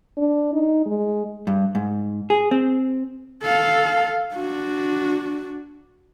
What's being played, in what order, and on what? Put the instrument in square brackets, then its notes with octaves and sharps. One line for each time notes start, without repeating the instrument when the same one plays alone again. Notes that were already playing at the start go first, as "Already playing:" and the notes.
[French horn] D4
D#4
G#3
[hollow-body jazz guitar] G2
G#2
G#4
C4
[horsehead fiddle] A4 F5
D4 F#4